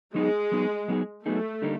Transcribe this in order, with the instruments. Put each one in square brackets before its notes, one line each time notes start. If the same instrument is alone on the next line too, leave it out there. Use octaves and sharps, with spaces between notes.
[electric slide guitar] F#3 B3 D#4 G#4 [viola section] G#3
[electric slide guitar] F#3 B3 D#4 G#4
F#3 B3 D#4 G#4
[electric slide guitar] F#3 B3 D#4 G#4 [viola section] A3
[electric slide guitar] D3 G3 A#3 D#4